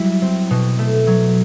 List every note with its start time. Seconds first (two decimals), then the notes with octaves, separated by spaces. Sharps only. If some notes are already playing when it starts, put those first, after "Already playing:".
Already playing: F#3 G3 E4
0.22 C4
0.50 B2
0.79 A3
1.07 F#3